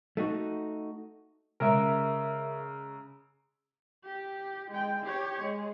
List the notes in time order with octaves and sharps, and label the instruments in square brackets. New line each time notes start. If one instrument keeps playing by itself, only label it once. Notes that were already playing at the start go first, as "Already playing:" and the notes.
[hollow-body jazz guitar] A3 D#4 F#4
[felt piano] C#3 G#3 [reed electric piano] A#4 E5 [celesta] A#5 E6 D7
[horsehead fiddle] G4
G#3 G5
G4 C#5
G#3